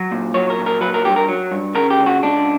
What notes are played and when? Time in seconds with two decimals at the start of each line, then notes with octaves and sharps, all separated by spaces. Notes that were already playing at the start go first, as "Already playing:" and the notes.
Already playing: F#3
0.11 A#2
0.34 F#3 C#5
0.50 A#4
0.59 A#2
0.66 A#4
0.81 F#3 B4
0.94 A#4
1.05 G2 G4
1.16 A#4
1.29 F#3
1.51 G2
1.75 C#3 A#4
1.90 G4
1.99 C#2
2.06 F#4
2.23 C#2 D4